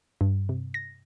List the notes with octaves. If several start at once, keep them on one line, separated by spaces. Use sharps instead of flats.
G2
C3
A#6